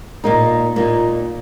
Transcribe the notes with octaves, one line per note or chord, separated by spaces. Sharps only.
A#2 A#3 D#4
A#2 A#3 D#4